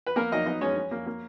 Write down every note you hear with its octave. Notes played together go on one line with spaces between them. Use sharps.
B4
A#3 B3 A#4
F#3 D#4 D#5
B3 D#4 D#5
G#3 C#4 C#5
C#4
A#3
A#3